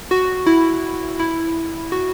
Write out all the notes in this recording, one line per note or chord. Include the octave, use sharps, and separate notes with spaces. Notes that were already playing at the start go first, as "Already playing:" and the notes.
F#4
E4
E4
F#4